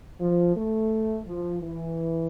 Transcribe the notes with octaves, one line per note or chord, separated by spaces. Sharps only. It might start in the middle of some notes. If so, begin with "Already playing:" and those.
F3
A3
F3
E3